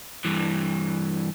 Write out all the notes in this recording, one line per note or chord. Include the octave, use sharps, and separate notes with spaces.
G2 E3